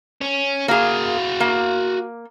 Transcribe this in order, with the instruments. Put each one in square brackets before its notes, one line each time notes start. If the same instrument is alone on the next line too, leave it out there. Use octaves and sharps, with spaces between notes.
[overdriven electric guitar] C#4
[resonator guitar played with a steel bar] A#3 G#4 [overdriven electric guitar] F#4 F5
[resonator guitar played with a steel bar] A#3